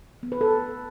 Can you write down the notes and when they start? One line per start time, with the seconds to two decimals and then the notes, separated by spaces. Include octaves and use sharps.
0.23 B3
0.32 B4
0.41 A4